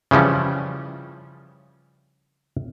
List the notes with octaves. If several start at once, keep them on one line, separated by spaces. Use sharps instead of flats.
C#3 E3 F3 G3 C#4